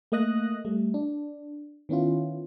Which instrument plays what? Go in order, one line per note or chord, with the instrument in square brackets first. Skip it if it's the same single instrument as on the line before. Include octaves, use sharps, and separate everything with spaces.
[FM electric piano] A3 A#3 D#5 D#6 F#6 A#6
G3 A3
D4
D#3 B3 C#4 E4 F4